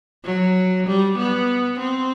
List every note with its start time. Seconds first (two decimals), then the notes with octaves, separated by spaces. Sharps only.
0.24 F#3
0.87 G3
1.18 B3
1.79 C4